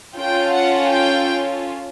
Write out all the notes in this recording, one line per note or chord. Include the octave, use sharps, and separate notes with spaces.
C#4 F4 A4 G5
F#5
G5